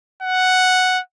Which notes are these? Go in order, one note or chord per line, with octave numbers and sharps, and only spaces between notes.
F#5